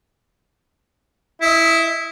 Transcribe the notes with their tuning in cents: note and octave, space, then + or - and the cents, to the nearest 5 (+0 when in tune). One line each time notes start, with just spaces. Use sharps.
E4 +0 D#5 +25